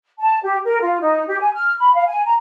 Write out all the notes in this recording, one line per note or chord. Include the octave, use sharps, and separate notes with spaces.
A5
G4
A#4
F4
D#4
G4
G#5
F6
B5
F5
G#5
A#5